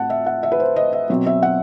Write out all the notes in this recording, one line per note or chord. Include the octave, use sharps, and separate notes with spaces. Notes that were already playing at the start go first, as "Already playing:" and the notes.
Already playing: A2 C4 F#5 A5
E5
F#5
E5
B4
C5
D#5
E5
B2 F#3 C4
E5
F#5